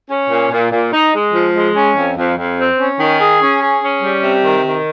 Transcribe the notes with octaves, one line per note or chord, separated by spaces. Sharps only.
C#4
A#2
A#2
A#2
D#4
G#3
F3
G#3
C#4
F2
F2
F2
C4
C#4
D#3
G#4
C#4
G#4
C#4
G3
C3
D#3
D#3